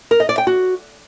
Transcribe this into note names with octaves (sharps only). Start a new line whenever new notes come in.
A#4
D#5
D5
G5
F#4